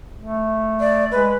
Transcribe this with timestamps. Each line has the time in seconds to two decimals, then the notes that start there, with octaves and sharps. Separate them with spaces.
0.19 A3
0.80 D5
1.12 G#3 B4